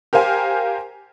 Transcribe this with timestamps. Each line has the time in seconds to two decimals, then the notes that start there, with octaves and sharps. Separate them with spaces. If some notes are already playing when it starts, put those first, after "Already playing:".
0.13 G4 A#4 C5 F5 G#5